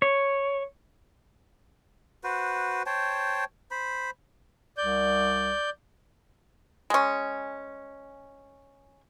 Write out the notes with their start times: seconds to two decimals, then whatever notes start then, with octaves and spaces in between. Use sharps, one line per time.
0.02 C#5
2.24 F#4 B4 C5
2.86 C5 C#5 G5 A5
3.71 C5 B5
4.77 C2 D5 G6
6.90 G#3 C#4